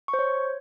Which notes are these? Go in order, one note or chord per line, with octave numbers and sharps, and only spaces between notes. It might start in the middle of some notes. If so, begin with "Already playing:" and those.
C#6
C5
C#5